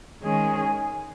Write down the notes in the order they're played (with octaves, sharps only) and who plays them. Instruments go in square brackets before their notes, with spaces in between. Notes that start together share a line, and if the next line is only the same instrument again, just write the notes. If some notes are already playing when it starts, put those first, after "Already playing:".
[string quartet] D#3 G#3 C#4 G#4